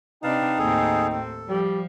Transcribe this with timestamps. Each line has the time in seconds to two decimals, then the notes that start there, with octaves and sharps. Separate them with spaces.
0.23 C3 D4 D#4 B4 F5 G5 A5
0.59 D#2 A2 C4 G#4 A4
1.12 A4
1.48 F3 G3 G4